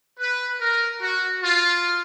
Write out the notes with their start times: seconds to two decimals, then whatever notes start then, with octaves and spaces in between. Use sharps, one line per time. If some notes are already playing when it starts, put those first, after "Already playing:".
0.19 B4
0.61 A#4
1.02 F#4
1.43 F4